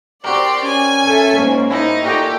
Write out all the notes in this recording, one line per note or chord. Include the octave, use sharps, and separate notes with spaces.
C4 F#4 G4 A#4 D5 C6
C#4 G#5
A4 E5
G#2 A#3
D#4 E4 G#5
A#2 F#4 G4 A4 G#5